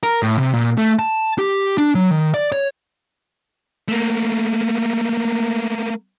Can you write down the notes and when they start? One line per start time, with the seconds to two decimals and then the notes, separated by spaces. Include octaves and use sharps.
0.03 A#4
0.23 A2
0.38 C3
0.54 A#2
0.78 A3
0.99 A5
1.39 G4
1.78 D4
1.95 F#3
2.11 D#3
2.34 D5
2.52 C#5
3.88 A3 A#3